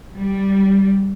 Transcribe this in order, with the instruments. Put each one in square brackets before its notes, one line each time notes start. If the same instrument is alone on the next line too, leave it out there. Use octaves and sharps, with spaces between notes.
[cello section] G3